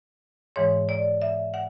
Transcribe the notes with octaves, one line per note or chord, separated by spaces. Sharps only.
G#2 E3 G#3 C#5
D5
E5
F#5